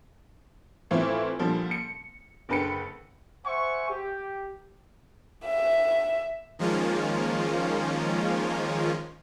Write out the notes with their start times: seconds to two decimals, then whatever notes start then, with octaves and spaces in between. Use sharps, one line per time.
0.91 A2 E3 A3 C4 E4 F4
1.39 A#2 D3 F3 G3
1.71 C#7
2.49 F#1 D3 B4 G5 C#7
3.45 C5 E5 F#5 G#5 C#6
3.90 G4
5.45 E5
6.59 D#3 F3 G#3 A#3 C#4 F4